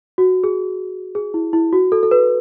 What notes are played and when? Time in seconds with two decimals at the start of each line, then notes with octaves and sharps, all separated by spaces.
0.18 F#4
0.44 G#4
1.15 G#4
1.34 E4
1.53 E4
1.73 F#4
1.92 A4
2.03 A4
2.11 B4